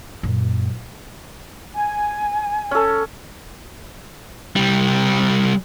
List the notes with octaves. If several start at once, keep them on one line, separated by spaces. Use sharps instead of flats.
F#2 A#2
G#5
C#4 A4
C2 G3